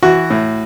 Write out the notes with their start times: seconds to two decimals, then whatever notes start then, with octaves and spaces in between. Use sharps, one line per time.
0.03 E3 F#4
0.30 A2